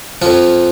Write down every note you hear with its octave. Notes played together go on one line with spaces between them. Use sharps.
F2 F3 F4